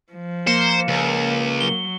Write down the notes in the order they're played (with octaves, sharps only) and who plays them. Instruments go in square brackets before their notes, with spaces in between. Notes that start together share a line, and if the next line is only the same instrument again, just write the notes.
[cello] F3
[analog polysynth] A#3 [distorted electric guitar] C5 [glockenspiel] C#7 E7
[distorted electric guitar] C#2
[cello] F#3 [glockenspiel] G7